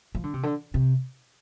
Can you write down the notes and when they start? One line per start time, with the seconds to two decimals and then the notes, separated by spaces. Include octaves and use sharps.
0.15 F3
0.24 D3
0.34 C3
0.43 D3
0.74 C3